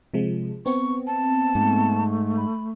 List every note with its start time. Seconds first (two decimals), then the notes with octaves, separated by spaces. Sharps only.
0.14 C3 F3 G#3
0.66 B3 C4 C#6
1.07 A5
1.55 G#2 A3
2.37 B5